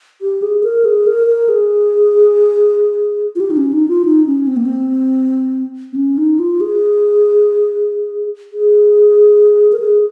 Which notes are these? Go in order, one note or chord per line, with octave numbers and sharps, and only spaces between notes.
G4
G#4
A#4
G#4
A#4
A#4
G#4
F4
G4
D#4
C#4
D#4
F4
D#4
C#4
C4
A#3
C4
C4
C#4
D#4
F4
G#4
G#4
A#4
G#4